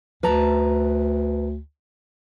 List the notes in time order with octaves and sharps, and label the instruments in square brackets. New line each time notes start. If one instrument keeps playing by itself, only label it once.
[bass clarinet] D2 [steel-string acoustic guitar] B4 A5 A#5